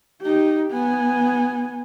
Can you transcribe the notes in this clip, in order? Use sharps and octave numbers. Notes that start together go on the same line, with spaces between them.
D#4 G4
B3 G#5